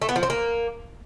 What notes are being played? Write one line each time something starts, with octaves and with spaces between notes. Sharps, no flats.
A3
B3
F3
C4
A#3